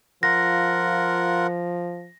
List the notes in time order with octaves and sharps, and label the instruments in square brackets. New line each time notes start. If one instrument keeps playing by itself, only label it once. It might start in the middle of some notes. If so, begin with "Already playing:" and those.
[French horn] F3 [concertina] F4 A#4 F#5 [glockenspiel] A#6